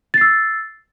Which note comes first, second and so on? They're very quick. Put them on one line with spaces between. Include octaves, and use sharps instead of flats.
A6 C7 E6